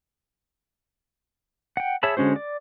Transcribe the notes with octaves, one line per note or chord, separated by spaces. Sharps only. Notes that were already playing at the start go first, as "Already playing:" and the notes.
F#5 G5
G#4 C#5 E5 A5 B5
D3 G#3 C#4 F#4 C5
D5